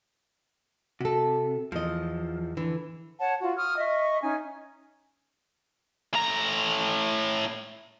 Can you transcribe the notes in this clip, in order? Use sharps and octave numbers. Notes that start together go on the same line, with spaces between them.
C3 F#4 A4
E2 F3 D#5
D3 E3
C#5 F#5 A5
F4 F#4
C#6 D#6 F6
D#5 E5 C#6
C#4 D#4 G#5
A2 A#5